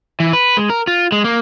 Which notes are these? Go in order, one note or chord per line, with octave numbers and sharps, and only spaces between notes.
E3
B4
G#3
A#4
F4
G#3
A#3